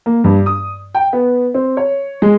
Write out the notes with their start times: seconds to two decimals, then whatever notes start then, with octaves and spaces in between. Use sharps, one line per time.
0.06 A#3
0.24 G2
0.46 D#6
0.94 G5
1.13 B3
1.54 C4
1.77 C#5
2.22 G#3